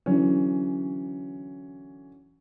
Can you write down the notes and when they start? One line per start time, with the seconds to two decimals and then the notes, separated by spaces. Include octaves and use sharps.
0.06 D3 E3 F#3 C#4